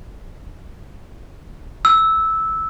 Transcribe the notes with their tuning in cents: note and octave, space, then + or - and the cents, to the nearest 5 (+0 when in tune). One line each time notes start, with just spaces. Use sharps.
E6 -10